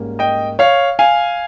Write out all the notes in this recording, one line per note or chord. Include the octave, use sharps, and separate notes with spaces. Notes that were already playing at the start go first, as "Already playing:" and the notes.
Already playing: G#2 G3 A#3 C#4
D#5 G5
C#5 F5
F5 G#5